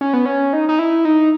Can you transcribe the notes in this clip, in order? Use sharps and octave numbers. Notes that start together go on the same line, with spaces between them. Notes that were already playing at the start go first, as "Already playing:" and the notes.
C#4
B3
C#4
D#4
D#4
E4
D#4